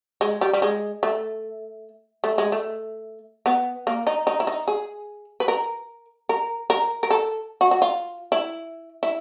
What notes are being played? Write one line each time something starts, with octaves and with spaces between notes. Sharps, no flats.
G#3
G3
G3
G#3
A3
A3
G#3
A3
B3
A#3
D#4
D#4
E4
D#4
G#4
B4
A#4
A#4
A#4
A#4
A4
F#4
F#4
F4
E4
E4